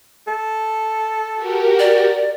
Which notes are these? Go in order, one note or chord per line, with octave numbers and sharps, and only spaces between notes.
A4
F#4 G4 A#4
D5